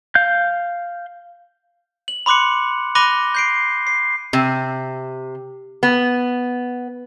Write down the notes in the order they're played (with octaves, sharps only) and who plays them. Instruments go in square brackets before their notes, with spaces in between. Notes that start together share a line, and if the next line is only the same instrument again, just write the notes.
[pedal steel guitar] F5 G6
[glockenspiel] F#7
B5 C6 D6 F#6 C#7
B5 D6 F#6 A#6 D#7 G7
G6 C7 D7
C7
[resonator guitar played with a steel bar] C3
B3